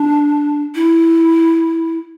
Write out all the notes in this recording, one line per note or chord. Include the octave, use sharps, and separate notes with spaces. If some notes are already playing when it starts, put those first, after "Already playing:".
Already playing: D4
E4